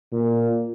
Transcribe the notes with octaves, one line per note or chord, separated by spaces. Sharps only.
A#2